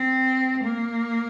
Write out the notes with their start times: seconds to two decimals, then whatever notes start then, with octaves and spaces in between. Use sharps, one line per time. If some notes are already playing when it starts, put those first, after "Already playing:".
Already playing: C4
0.63 A#3